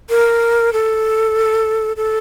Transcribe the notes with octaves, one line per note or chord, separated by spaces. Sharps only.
A#4
A4
A4